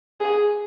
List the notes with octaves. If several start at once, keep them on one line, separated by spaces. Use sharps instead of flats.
G#4